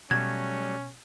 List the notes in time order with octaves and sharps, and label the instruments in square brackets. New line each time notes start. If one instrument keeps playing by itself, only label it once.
[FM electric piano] B2 [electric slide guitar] F#3 G3 A3 [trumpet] C#4 [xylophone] G#6